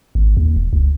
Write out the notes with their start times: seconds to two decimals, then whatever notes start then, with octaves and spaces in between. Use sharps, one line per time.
0.15 G#1
0.37 D#2
0.56 E1
0.73 C#2